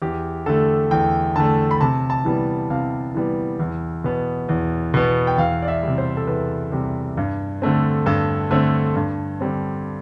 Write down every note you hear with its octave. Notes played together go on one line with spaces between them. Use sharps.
E2 G4
D3 A3 A4
E2 G5
D3 A3 A5
B5
C3 A5
A5
E3 G3 B3
C3 F5
E3 G3 B3
E2
B2 B3
E2
B2 B3
G5
E2 F5
D5
E5
C3 G3
C5
A4
E2 B4
C3 G3
G2
D3 A3 C4
G2 A4
D3 A3 C4
G2
D3 G3 C4